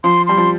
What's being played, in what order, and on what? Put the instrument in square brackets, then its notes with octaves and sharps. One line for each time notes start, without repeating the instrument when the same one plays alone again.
[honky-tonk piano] F3 [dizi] C6
[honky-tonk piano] G3 [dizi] C6
[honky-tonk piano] F3